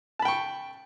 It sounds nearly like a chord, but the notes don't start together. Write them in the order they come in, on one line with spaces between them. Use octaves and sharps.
A5 B5 G5 C#6